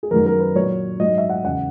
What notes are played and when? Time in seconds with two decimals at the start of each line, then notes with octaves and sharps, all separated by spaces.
0.03 G#4
0.11 F#2 D#3 F#3 A#4
0.26 A#4
0.40 B4
0.55 A#2 F#3 C#5
1.00 G#2 F#3 D#5
1.18 E5
1.30 F#5
1.44 E2 C#3 E3 F#5